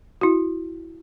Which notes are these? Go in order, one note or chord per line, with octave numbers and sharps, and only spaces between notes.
E4 F#4